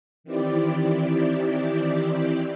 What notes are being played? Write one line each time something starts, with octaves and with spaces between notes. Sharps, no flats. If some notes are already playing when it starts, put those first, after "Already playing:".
D#3 E3 C4 E4 G4 D5